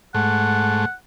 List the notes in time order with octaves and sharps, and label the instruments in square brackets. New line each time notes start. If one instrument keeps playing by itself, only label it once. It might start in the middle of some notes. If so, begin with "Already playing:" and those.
[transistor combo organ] G#2 A3 [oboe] F#5